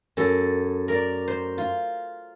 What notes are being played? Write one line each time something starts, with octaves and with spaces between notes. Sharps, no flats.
F#2 A4
A#4 D5
C5
F4